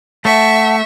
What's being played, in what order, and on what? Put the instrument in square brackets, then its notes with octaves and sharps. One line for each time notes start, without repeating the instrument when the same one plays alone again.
[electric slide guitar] A3 [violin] E5 C#6 [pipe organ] F#5 A5